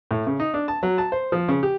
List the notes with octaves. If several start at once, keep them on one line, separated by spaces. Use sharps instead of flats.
A2
C#3
D#4
D4
A5
F#3
A5
C5
F3
C#3
G4